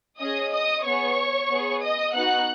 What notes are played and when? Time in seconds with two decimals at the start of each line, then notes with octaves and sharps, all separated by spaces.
0.19 C#4 G#4 D#5 D#6
0.52 D#5 D#6
0.85 B3 G#4 C#5 C#6
1.50 B3 G#4
1.83 D#5 D#6
2.15 B3 D#4 F#4 F#5 F#6